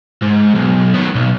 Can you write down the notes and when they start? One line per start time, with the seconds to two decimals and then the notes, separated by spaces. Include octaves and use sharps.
0.22 G#2
0.55 B1
0.95 D#3 B3
1.15 B1